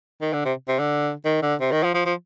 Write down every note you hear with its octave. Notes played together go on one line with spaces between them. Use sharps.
D#3
D3
C3
C3
D3
D#3
D3
C3
D#3
F3
F3
F3